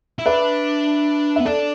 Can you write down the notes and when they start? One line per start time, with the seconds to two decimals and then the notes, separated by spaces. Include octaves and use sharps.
0.19 E4
0.26 D4 B4 E5
1.36 B3 E5
1.45 D4 A4 D5